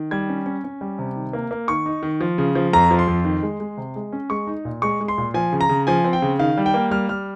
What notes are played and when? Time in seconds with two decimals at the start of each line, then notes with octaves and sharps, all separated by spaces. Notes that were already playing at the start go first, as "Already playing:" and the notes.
Already playing: D#3
0.11 G3 G#6
0.29 C#4
0.46 C#4
0.64 C#4
0.81 G3
0.99 C3
1.16 D#3
1.33 A#3
1.51 A#3
1.68 D#3 C#6
1.86 D#4
2.03 D#3
2.21 F3
2.38 C#3
2.55 F3
2.73 F2 A#5
2.91 F3
2.99 C6
3.08 F2
3.25 D#3
3.43 G#3
3.60 G#3
3.77 C3
3.96 G#3
4.13 C#4
4.30 G#3 C#6
4.47 D#4
4.65 A#2
4.82 G#3 C#6
5.00 G#3
5.08 C6
5.18 A#2
5.34 F3 G#5
5.53 C#3
5.61 A#5
5.69 C#3
5.87 F3 G#5
6.04 C4
6.13 G5
6.22 C#3
6.39 D#3 F5
6.57 G3
6.66 G5
6.74 A#3
6.91 G3 F6
7.09 G3 F6